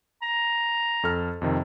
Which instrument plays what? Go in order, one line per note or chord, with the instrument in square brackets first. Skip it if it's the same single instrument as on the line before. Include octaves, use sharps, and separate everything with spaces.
[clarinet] A#5
[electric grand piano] F2 A4 F6
F2 C3 D#3